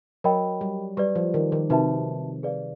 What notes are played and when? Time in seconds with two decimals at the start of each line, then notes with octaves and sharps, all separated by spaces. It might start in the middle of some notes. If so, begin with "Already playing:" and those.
0.24 F#3 A#4 D#5 G5 B5
0.61 G3
0.97 G3 G4 B4 D5
1.16 F3
1.34 D#3
1.52 D#3
1.70 C3 D#4 F#4 B4 E5 A5
2.43 G#4 B4 D5 F5